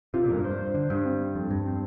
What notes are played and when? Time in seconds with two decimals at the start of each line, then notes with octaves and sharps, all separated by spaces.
0.14 C3 F4
0.24 A#2
0.29 F2 A#4
0.34 G2
0.44 G2 C5
0.75 D3
0.90 G2
1.05 C4
1.35 F2
1.50 G2
1.66 C4